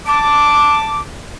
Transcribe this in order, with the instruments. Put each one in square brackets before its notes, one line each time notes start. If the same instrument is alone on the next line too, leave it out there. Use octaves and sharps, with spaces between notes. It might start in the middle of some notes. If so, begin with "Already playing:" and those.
[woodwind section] A5 D6